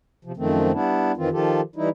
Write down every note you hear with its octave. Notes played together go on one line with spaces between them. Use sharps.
C3 F3
F#2 D#3 F3 A3 C4
G3 B3 D4 E4
F2 D#3 E3 C4 F4
D#3 F3 F4 G4 A4
E3 G3 D#4 E4